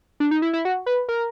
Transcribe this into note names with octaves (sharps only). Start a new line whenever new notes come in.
D4
D#4
E4
E4
F#4
B4
A#4